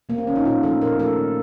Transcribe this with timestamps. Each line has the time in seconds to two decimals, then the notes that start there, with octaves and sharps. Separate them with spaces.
0.09 C3 A#3
0.18 C4
0.27 D#3 F#3 C#4
0.36 D#4
0.45 A#2 F4
0.63 F3 A3 A4
0.81 A#2 A#4
0.99 F3 A3 A4
1.18 D#3